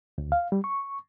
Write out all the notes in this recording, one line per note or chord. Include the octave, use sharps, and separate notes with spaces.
D2
F5
G3
C#6